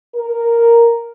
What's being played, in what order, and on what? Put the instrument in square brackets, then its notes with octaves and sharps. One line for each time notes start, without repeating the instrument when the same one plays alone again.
[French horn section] A#4